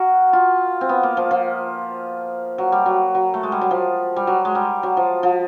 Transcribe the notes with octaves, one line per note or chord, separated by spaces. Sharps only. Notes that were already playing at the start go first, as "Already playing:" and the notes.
Already playing: F#4 A#4
F4
C4
B3
A#3
F3
F3
F#3
G3
F#3
F#3
A3
G#3
G3
F#3
F3
G3
F#3
G#3
G3
F#3
F3
F3